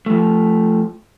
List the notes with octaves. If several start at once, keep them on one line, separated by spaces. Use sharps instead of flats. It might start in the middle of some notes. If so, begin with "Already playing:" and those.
F3 A3